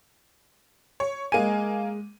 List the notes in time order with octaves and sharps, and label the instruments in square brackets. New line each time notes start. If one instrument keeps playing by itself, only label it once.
[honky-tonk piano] C#5
[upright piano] G#3 D#7 [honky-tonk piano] A#3 G#5